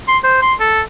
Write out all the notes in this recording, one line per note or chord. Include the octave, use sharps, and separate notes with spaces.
C6
C5
C6
A4